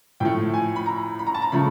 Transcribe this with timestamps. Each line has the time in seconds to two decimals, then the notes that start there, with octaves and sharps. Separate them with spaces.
0.20 A2 F3 A3 G5
0.54 G#5
0.76 B5
0.86 A#5
1.19 B5
1.27 A#5
1.34 A5
1.42 A#5
1.52 C#3 F3 A3 B5